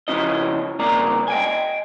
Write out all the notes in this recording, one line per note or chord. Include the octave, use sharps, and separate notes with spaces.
C#3 F3 C#4 E4 D#5
C2 C#3 A#3 D5 A#5
D#5 G5 G#5